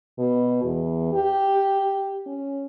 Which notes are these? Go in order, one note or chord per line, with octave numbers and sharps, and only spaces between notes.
B2
E2
G4
C#4